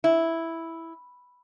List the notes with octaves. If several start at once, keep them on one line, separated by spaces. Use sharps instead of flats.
E4